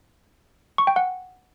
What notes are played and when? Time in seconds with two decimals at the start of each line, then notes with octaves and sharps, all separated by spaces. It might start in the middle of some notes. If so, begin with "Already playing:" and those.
0.78 C#6
0.87 G5
0.96 F#5